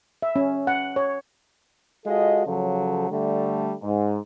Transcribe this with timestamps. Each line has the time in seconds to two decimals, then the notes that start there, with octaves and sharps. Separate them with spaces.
0.22 E5
0.36 C#4
0.67 F#5
0.96 C#5
2.06 G#3 F4 F#4 A4 D#5
2.46 C#3 F3 F#3 A4
3.10 D3 G3 A3
3.83 G#2